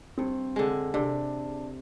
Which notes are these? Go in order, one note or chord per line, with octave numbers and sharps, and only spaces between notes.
G2 C4
D3 G#3
C3 D4